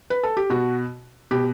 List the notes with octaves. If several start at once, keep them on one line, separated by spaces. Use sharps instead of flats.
B4
A4
G4
B2 F#4
B2 G4